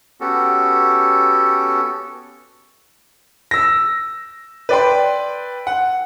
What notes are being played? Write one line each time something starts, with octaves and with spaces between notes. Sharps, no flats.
B3 C#4 F#4 G4 A4
E6 A#6
B4 D5 G5 C6
F#5